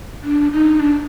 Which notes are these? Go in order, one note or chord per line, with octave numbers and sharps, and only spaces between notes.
D4
D#4
D4